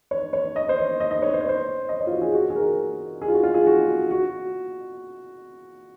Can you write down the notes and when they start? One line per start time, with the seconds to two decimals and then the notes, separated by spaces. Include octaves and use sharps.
0.11 C#5
0.33 C#5
0.56 D#5
0.69 C5
0.78 C#5
1.00 D#5
1.11 D#5
1.22 C#5
1.34 C5
1.41 C#5
1.49 C5
1.89 D#5
2.00 C#5
2.07 F4
2.11 F#4
2.22 G#4
2.33 F#4
2.50 G#4
2.55 A#4
3.22 G#4
3.28 F4
3.33 F#4
3.43 F4
3.54 G#4
3.66 F#4
4.11 F#4